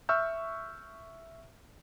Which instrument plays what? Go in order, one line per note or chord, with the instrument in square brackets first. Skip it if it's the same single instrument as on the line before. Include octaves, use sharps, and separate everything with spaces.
[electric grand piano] E5 C#6 E6 F6 G6